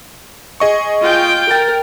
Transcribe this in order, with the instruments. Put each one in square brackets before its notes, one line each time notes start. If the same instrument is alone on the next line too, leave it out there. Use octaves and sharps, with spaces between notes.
[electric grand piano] G#4 D#5 C#6
[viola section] F4 G5
[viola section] A#4 [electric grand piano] G5 A6